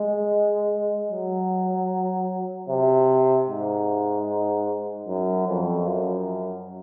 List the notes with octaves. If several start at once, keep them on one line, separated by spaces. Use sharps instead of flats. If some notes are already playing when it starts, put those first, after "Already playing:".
Already playing: G#3
F#3
C3
G#2
F#2
F2
F#2